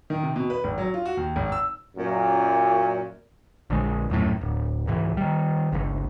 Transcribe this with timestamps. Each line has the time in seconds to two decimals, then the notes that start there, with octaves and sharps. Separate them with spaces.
0.10 D#3
0.23 C3
0.36 B2
0.50 B4
0.64 G#1
0.78 F#3
0.94 F4
1.06 F#4
1.17 D#2
1.36 G#1
1.52 E6
1.97 F#2 A#2
3.70 A#1 D3 G#3
4.10 D#1 F#2 A2
4.41 D1
4.87 C#2 G#2 E3
5.17 D#3 G3
5.72 G1 C#2